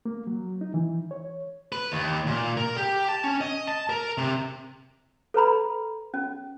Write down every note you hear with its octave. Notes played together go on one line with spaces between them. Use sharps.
A#3
F#3
D#4
E3
C#5
B4
D#2
A#2
A#4
G4
A5
C#4
D#5
A5
A#4
C3
A4 B4 A#5 B5
C#4